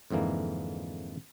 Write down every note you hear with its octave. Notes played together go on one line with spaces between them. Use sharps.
F2 G#2 D3 E3 A#3